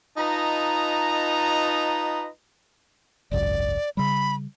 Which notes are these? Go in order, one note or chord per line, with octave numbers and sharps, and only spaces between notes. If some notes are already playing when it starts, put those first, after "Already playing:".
D#4 F4 B4 D#5 A5 A#5
G#1 C#2 F#2 D5
C#3 G3 B5